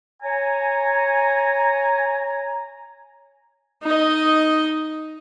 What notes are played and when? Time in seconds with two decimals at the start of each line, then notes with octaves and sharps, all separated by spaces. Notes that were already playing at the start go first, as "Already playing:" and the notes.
0.23 C#5 G#5 A#5
3.83 D#4 D#5